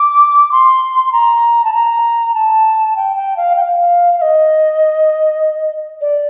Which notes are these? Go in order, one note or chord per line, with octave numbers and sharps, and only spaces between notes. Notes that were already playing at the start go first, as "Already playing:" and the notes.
Already playing: D6
C6
A#5
A5
A#5
A5
G5
G5
F5
G5
F5
F5
D#5
D5